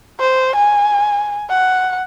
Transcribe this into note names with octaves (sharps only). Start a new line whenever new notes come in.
C5
G#5
F#5